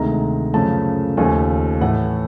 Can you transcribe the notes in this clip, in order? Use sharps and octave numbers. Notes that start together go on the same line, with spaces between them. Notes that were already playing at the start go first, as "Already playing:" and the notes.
Already playing: D2 C3 D#3 G#3 A#5
F#2 C#3 F3 A3 A5
D#2 C#3 F3 A3 G#5
A2 E3 A3 F#5